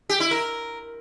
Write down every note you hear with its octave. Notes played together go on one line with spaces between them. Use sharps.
G4
E4
A#4